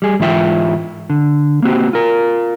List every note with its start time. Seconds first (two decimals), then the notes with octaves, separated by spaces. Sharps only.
0.02 G3 G#4
0.20 G#2 E3 F4 E5 G5
1.10 D3
1.62 A#3 C4 F#4 G4
1.93 F4 A#4